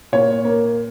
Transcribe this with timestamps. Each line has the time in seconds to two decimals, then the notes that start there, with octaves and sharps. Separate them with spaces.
0.12 A#2 C#5
0.45 A#3